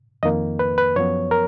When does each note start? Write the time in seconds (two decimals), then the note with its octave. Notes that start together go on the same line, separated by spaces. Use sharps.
0.23 F2 D#3 A#3 D#5
0.59 B4
0.78 B4
0.96 F#2 F3 B3 C#5
1.31 A#4